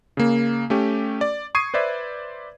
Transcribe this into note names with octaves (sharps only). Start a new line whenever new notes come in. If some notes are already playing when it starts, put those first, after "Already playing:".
C#3 A#3
A3 C#4 G4
D5
C#6 D#6 G#6 C7 D#7
B4 C5 D5 E5